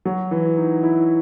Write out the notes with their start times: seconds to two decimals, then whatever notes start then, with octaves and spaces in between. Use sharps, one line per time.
0.05 F#3
0.31 E3
0.57 D#4
0.83 E4